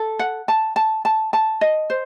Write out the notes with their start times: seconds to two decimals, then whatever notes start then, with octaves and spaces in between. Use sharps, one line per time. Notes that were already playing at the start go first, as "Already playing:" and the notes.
Already playing: A4
0.19 F#5
0.48 A5
0.76 A5
1.05 A5
1.33 A5
1.61 D#5
1.90 C5